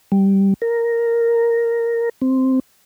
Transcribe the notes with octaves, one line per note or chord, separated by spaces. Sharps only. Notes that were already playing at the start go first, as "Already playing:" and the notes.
G3
A#4
C4